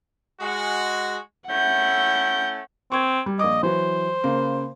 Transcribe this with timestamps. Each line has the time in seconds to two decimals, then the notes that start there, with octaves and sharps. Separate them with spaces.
0.41 G#3 F#4
1.48 A3 C#4 E4 F#5 G6
2.92 C4 C#6 G#6
3.26 G3
3.39 A#1 D#5 D6
3.63 E3 F#3 C5
4.24 C#3 A#3